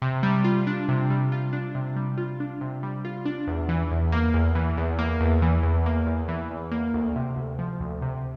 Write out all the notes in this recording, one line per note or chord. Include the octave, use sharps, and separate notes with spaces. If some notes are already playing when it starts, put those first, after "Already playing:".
C3
G3
F4
D4
C3
G3
F4
D4
C3
G3
F4
D4
C3
G3
F4
D4
E2
E3
E2
A#3
E2
E3
E2
A#3
E2
E3
E2
A#3
E2
E3
E2
A#3
D2
C3
D2
F3
D2
C3